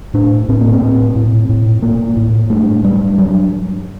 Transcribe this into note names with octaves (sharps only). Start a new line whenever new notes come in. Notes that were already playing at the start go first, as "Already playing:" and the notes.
A2 D4
A2 C4
A#3
C4
A2
A2
A2
A2 A#3
A2
G2 A3
G2 G3
G2 F#3